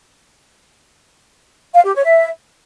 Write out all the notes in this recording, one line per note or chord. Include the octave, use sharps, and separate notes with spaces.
F5
G4
C#5
E5